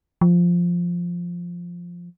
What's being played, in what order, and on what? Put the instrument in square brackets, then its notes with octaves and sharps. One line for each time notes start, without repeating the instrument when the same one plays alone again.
[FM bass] F3